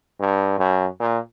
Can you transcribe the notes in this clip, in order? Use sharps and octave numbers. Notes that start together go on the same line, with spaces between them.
G2
F#2
A#2